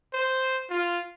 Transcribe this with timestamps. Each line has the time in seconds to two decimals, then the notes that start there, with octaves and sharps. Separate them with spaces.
0.13 C5
0.70 F4